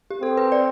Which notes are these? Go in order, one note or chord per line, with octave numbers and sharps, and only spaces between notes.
G4
C4 A4
B4
D5